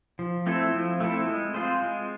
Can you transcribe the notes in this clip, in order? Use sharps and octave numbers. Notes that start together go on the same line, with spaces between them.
F3
A3 C4 E4 A4
F3
A3 C4 E4 A4
G#3
C4 F4 G#4 C5
G#3